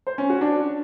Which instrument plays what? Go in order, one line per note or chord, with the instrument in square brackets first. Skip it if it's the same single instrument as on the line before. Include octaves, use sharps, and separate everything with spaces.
[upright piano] C5
C#4
F#4
D4